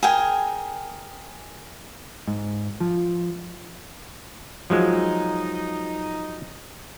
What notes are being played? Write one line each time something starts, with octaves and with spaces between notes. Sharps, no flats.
G#4 A#4 G5 G#5
G#2
F3
F3 F#3 G#3 D#4